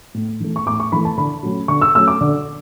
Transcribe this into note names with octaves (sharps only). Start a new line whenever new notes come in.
A2
E3 A3
C#6
A2 D6
C#6
E3 A3 B5
A5
D3 B5
F#3 A3 C#4
D3 C#6
E6
F#3 A3 C#4 E6
D6
D3